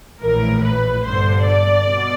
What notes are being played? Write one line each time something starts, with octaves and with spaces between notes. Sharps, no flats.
A#1 A2 E3 A#4
B4
G1 G2 D3 C5
D5
B2